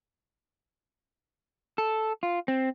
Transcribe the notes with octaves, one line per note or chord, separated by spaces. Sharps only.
A4
F4
C4